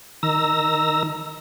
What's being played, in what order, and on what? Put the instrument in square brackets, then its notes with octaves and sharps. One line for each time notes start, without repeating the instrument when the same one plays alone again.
[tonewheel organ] D#3 A#5 E6 A#6